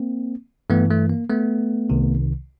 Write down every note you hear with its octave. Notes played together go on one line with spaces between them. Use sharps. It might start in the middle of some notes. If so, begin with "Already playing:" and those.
Already playing: A#3 C4
G2 E3 A3 B3
A3
A#3
A3 B3
C2 C3 D#3